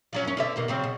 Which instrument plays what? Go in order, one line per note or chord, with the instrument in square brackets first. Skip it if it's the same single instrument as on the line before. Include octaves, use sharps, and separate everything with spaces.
[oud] F3 F#3 C#4
F#2 C#4
B2 D3 E5
D#2 B2 A#3
C#3 F#3 C4
B2